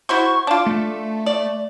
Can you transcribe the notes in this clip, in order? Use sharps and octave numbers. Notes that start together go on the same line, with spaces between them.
E4 F#4 C5 C#6
D4 F4 D6
A3
D5